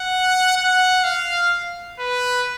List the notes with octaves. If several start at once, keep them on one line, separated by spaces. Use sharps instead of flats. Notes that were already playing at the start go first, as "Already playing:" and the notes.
Already playing: F#5
F#5
F5
B4